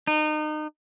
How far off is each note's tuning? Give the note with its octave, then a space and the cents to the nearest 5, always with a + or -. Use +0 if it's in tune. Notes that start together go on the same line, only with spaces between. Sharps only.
D#4 -30